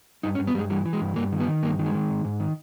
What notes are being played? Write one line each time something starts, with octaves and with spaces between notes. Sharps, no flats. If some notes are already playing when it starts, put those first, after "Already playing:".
G2 D#4
C#4
G2
B3
G2 G3 G#3
E3 G3
E3
G#3
G2
G2 A#3
D#3
B3
D#3
G2 A#3
D#3
G#3
D#3
G#2
G#2
D#3